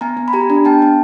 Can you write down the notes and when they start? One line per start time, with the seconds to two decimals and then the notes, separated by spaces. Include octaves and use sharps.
0.01 B3 G#5 A#5
0.17 B3
0.28 B5
0.33 G4 G#5 A#5
0.50 D4
0.65 B3 G5 A5
0.82 B3